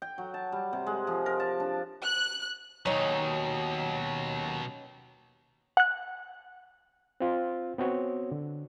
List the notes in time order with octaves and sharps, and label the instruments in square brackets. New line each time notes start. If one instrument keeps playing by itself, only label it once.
[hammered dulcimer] G5
F#3
A5
G3
C3
G#3
F3
A#4
A5
D4
[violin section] F#6
[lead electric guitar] D#2 [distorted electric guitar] B2 F#3 [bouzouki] C#4 D#4
[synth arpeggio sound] F#5 F#6
[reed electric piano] C4 F4
B3 C4 F#4 C#5
D3